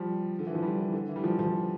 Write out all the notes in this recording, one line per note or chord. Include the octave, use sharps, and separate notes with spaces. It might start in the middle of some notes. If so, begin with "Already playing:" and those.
Already playing: F3 G3
D3
E3
F3
G3
E3
D3
E3
G3
F3
F3